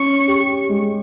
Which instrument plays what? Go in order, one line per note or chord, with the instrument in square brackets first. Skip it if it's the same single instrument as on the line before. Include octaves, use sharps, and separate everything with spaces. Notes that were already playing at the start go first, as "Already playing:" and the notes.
Already playing: [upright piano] C#4 [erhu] C#6
[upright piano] G4
G#3